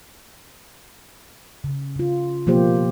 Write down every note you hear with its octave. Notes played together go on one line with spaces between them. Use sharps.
C#3
C#3 F4
B2 F3 A#3 F4 G4 C5